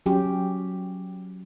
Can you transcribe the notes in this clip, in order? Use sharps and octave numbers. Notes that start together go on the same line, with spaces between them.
F#3 C#4 G4